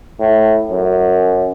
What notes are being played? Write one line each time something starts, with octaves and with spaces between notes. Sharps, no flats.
A2
F#2